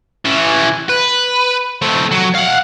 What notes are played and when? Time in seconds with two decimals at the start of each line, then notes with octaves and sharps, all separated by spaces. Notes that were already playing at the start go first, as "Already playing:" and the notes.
0.25 E3 C#4
0.89 B4
1.82 A3 C4
2.11 F#3
2.35 F5 F#5